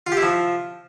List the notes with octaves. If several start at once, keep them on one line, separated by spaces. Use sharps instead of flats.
F4
G4
E4
F3